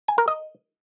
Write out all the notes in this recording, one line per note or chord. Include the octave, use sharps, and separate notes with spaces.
G#5
A#4
D#5